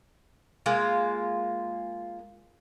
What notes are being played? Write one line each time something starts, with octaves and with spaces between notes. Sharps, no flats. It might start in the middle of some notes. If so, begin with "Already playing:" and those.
G#3 A#3 F4